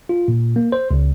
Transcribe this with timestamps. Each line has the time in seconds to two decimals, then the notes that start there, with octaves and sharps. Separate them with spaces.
0.09 F4
0.28 A#2
0.56 A#3
0.72 C5
0.91 C#2